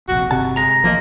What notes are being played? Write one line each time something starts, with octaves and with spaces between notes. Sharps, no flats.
D1 A#1 C3 F#4
G1 C3 F#4 A5
G#3 A#5 A#6
A1 F3 A#3 D#5